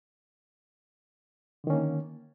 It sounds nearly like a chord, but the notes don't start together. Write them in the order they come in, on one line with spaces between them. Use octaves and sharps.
D3 D#3 C#4 A#3